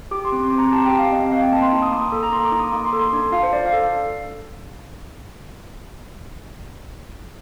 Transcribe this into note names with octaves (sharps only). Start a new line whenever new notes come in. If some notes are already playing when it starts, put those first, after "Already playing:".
G4 D6
C6
C4 D6
C6
C4
A#5
G4 A5
G5
G4
F5
C4 D#5
D#5
C4 F5
G5
A#3 A5
C6
D#4
D#6
A#3 D6
D#6
A4
A#5
A#3 C6
D6
D#4
D#6
A#3 D6
C6
A4
C6
D4
F4 F5
C5
D4 D5
F5
A4